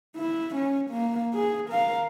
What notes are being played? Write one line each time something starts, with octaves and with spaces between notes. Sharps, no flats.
E4
C#4
A#3
G#4
A#4 F5